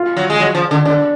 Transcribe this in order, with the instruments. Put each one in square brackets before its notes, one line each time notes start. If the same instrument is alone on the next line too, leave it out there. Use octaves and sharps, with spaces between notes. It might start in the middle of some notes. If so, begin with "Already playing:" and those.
Already playing: [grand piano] F4
[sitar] F#3
G#3
F#3
F3
D3
[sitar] D3 [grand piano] D4